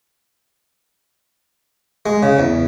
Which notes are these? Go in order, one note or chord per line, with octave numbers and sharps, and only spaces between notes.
G#3
C#3
E2